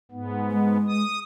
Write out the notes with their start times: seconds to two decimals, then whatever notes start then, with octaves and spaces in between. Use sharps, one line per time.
0.11 G#2 B3
0.51 G#3
0.87 D#6